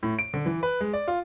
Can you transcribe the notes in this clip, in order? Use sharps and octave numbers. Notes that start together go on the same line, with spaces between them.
A2
D7
D3
E3
B4
G#3
D5
F4